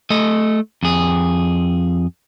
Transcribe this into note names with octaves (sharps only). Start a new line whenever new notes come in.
A3 D#5
F2 G#4